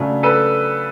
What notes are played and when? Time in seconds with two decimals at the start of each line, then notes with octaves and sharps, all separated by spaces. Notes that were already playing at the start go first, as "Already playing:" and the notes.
Already playing: C#3 F#3 A3 D4
0.23 A4 B4